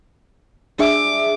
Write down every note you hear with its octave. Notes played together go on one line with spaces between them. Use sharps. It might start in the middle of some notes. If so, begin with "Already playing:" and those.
D4 G#4 E5 D6